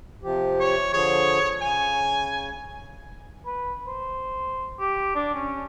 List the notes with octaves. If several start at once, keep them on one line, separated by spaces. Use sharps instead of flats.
C3 F3 G4
C#5
D3 F3 G#4 C#5
C#3 G#5
B4
C5
G4
D4
C#4